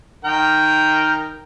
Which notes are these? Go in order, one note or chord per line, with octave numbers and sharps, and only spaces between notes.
D#3 A#4 G5